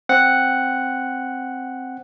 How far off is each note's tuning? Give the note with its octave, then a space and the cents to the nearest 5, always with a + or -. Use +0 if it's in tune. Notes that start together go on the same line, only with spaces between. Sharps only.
C4 +0 F#5 +0